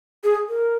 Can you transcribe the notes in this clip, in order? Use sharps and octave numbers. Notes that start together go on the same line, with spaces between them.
G#4
A#4